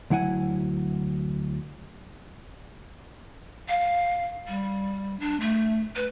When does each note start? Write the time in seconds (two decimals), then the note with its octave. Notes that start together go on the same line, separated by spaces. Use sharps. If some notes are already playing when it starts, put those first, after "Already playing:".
0.10 D2 F#3 E4 F#5 G#5
3.69 F5
4.48 G3
5.20 D4
5.40 A3
5.96 B4